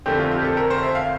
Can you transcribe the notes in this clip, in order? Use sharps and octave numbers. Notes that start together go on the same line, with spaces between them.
F2 D3 A3 C4 G4
F4
G4
A4
A#4
C5
E5
F5